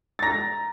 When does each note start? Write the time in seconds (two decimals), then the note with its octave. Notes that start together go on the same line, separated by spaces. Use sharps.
0.19 A6
0.23 A#5 A#6